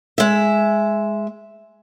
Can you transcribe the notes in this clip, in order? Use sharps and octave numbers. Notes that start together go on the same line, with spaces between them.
G#3 E5